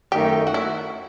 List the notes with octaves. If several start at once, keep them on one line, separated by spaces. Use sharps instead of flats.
F#2 D#3 A3 D#4 G4
F#4
E4